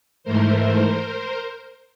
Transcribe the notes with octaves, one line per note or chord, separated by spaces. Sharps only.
G#2 E3 A3 A#4 C5